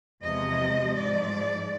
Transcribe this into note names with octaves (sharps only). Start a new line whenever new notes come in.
E2 C3 F3 G#3 D#5
G#2 F3 G#3 D5